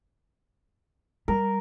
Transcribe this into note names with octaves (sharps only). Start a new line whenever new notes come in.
G3 A#4